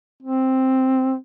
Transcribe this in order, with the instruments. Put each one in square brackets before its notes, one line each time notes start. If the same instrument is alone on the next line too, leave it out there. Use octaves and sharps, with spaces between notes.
[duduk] C4